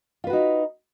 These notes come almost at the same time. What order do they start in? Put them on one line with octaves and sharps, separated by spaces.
F4 B4 F#4 D#4